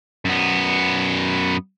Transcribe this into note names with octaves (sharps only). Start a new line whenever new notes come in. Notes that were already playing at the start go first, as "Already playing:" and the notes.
F#2 B3